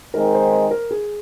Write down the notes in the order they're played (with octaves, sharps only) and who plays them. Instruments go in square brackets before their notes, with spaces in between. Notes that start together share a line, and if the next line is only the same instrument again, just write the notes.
[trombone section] D#3 G#3 C4 D#4 [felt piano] A#4
[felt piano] C5
C5
A#4
G#4